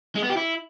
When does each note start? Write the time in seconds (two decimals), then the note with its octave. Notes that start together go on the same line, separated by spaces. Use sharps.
0.15 G#3
0.22 B3
0.30 G4
0.37 E4